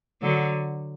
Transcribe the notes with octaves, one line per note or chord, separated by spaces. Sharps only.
D3 F#3